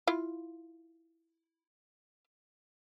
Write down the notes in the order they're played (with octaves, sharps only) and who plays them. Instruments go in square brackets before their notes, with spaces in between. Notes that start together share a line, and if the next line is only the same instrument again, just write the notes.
[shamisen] E4 F4